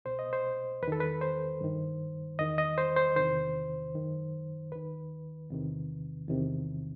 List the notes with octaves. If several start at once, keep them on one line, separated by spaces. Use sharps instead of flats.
C2 B2 C5
D#5
C5
E2 B4
D#3 A4
B4
C5
G2 D#3
E2 D#3 D#5
D#5
C5
C5
E2 C3 D#3 C5
F#2 D#3
D#2 D#3 B4
E2 C3 D#3
E2 C3 D#3